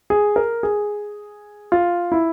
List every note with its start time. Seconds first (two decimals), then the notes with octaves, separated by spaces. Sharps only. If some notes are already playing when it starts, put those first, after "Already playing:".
0.10 G#4
0.36 A#4
0.63 G#4
1.72 F4
2.12 E4